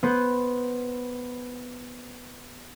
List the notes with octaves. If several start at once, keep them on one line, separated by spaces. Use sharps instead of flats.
B3 B4 C5